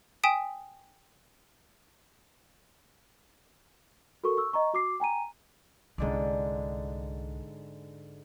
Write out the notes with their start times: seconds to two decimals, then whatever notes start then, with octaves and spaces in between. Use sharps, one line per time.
0.24 G5 G#5 D#6 B6 D7 E7
4.24 F#4 A4 A#4 C#6
4.37 C#6 E6
4.53 D#5 A#5 C#6
4.73 F#4 D6 C7
5.00 G5 G#5 A#5 D#7
5.98 C2 G#2 D3 C#4 D6